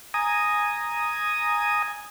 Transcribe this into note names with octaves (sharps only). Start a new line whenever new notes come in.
G#5 A#5 D#6